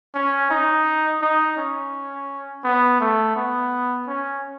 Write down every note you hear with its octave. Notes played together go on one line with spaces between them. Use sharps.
C#4
D#4
D#4
C#4
B3
A3
B3
C#4